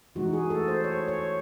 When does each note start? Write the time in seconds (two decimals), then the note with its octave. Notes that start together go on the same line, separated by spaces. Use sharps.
0.15 E3 G#3 D#4 F#4
0.33 G#4
0.50 A4
0.68 C5
0.84 C#5
1.08 C#5